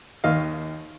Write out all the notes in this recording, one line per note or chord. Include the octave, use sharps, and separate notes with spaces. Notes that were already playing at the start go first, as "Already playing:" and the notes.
D#2 D#3 D#5 F5